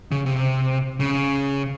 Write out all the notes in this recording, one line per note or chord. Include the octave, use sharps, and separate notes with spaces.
C#3
C3
C#3